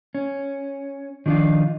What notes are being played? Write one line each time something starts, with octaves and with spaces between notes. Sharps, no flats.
C#4
D#3 F3 D4 D#4 F4